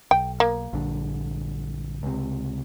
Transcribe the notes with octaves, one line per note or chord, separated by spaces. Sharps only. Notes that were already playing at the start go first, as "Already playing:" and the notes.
B1 G5
A#3
A#1 G2 D3
C#2 C3